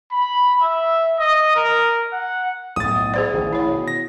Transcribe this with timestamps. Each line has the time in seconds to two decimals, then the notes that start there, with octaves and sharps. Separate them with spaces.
0.12 B5
0.63 E5
1.20 D#5
1.56 A#4
2.13 F#5
2.76 B1 A2 A3 D#6 A6
3.14 G#4 C5 D5
3.34 A1 D#3 E3
3.53 E4 C#5
3.69 B2
3.88 A#6